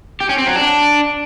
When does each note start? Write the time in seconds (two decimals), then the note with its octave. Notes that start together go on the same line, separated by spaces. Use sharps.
0.20 G4
0.29 C#4
0.38 C4
0.47 F#3
0.56 D4